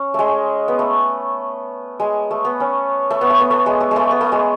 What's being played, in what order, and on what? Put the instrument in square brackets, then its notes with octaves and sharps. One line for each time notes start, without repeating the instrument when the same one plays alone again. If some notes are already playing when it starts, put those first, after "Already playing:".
Already playing: [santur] C#4
G#3 A3
B3
A3
G#3
A3
B3
C#4
A3
B3
A3
B3
A3
G#3
A3
G#3 A3
B3
A3
G#3